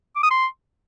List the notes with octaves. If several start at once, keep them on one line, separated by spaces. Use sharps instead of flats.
D6
D#6
C6